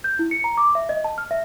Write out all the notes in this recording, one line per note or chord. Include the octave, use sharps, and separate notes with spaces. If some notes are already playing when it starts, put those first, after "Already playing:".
G6
E4
C#7
A#5
D6
E5
D#5
A5
F6
E5